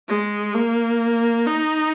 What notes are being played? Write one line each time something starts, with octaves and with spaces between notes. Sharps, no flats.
G#3
A#3
D#4